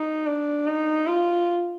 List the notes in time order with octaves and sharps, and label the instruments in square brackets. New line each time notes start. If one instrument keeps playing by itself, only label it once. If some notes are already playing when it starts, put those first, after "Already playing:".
Already playing: [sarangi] D#4
D4
D#4
F4